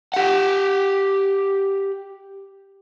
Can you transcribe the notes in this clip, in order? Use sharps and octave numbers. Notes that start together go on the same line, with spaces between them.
G4 F#5